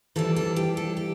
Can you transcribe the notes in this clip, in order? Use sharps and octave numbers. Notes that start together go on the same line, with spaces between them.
E3 G3 D4 A4
A4
G4
A4
G4